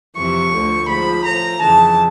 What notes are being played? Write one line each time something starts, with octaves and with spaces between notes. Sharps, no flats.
F2 C3 E3 C#6
D2 D3 F3
G#2 F3 B5
A2 F3 A#5
F2 C#3 E3 A5